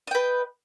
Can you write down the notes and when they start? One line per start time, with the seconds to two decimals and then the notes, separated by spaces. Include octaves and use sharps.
0.07 D#5
0.11 G5
0.15 B4